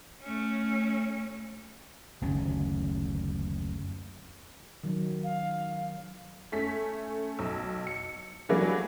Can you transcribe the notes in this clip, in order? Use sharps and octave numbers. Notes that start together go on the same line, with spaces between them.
A3 C#4
F#1 D2 D#3 C#4
D#3 F#3
F5
A3 C#4 B6
B1 E6
C#7
D3 E3 F#3 G3 A3 A#3